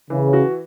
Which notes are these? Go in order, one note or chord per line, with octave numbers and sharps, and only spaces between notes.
C#3 E3
F#4